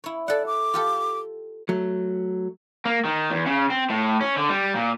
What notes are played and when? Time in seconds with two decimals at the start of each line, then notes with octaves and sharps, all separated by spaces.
0.04 E4 C#5
0.28 A4 D5 F#5
0.46 D6
0.74 F4 G4 A4
1.69 F#3 A3
2.85 A#3
3.05 D#3
3.30 E2
3.46 C#3
3.71 C4
3.90 A2
4.21 C#4
4.37 D3
4.49 G3
4.75 A#2